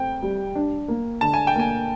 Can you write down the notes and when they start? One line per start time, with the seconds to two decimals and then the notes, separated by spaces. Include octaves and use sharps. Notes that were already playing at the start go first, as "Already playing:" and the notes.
Already playing: A3 C4 G5
0.22 G3
0.55 D4
0.88 A#3
1.21 D3 A5
1.34 G#5
1.47 G5
1.56 A#3 G#5